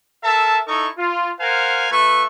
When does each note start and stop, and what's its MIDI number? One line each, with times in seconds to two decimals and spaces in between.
0.24 0.59 69
0.24 0.59 70
0.24 0.59 76
0.24 0.59 81
0.66 0.88 63
0.66 0.88 64
0.66 0.88 69
0.66 0.88 75
0.66 0.88 85
0.97 1.31 65
1.39 1.86 70
1.39 1.86 72
1.39 1.86 77
1.39 1.86 78
1.39 1.86 80
1.91 2.24 57
1.91 2.24 65
1.91 2.24 71
1.91 2.24 76
1.91 2.24 85